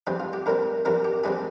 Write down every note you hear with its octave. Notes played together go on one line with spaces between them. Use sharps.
G2 G3 C4 G#4
F4
G4
G2 G3 C4 A#4
G2 G3 C4 A#4
G4
G2 G3 C4 G#4